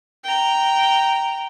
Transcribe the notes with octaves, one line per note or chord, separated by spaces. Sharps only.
G5 A#5